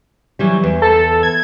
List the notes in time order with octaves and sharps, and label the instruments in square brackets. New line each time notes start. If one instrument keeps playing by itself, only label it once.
[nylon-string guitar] E3 F#3 G3
E2
[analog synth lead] A4
G#6